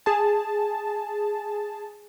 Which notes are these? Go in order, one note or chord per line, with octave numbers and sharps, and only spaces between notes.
G#4 A5